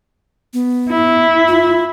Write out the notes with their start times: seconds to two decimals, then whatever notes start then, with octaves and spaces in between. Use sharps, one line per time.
0.54 B3
0.89 E4
1.48 F4